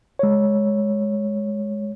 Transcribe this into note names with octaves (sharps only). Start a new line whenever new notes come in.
G#3 C#5